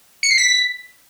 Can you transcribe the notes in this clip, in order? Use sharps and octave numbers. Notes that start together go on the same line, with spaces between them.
C#7
C7
B6